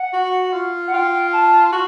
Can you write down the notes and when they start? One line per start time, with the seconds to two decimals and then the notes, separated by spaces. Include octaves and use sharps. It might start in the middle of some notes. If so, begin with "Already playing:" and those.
Already playing: F#5
0.13 F#4
0.53 F4
0.87 F#5
0.93 F4 G5
1.33 A5
1.72 F#4